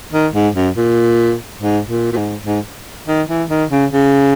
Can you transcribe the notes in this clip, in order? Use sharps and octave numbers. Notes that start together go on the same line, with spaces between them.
D#3
G#2
F#2
A#2
G#2
A#2
A#2
G#2
G#2
D#3
E3
D#3
C#3
C#3